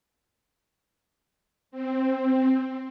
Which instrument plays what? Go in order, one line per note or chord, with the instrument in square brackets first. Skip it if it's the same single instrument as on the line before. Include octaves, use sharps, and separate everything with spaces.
[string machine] C4